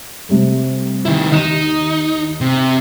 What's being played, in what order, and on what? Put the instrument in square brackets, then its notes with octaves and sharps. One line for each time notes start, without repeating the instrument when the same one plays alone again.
[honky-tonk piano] C3 G3 A3
[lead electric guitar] D#3 E4
[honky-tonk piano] D#2 D#6 E7 [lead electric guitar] D#4
[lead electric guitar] C3